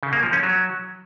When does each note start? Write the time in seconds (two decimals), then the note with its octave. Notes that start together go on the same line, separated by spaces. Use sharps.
0.03 C#3
0.13 A#3
0.23 F3
0.33 C#4
0.43 F#3